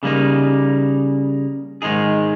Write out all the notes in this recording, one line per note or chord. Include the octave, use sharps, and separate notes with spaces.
C#3 G3 A#3 D#4
G#2 D#3 G#3 D#4 G#4